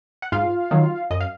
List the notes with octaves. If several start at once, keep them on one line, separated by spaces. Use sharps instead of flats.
F#5
G#2 F4 F5
D#3 F#3
F#2 D#5
F5